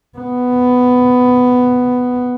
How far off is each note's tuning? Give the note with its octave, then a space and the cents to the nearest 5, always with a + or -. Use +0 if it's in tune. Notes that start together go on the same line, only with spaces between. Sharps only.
B3 +10